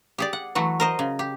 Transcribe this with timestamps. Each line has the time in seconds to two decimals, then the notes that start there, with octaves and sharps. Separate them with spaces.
0.18 G4 G#4 D5
0.33 F#5
0.55 E3 F#3 A3 F#4
0.80 A#4 C5 D#5
0.99 C#3
1.19 G4